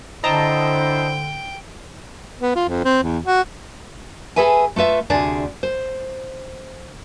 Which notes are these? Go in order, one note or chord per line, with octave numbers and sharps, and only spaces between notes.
D3 D4 E4 C5 D#5 G5 A5 A#5
B3
F4
F2
C4
E2
F#4
G#4 A4 B4 E5 G#5
A3 F4 B4 E5
D2 C3 D4 G#4 D5
C5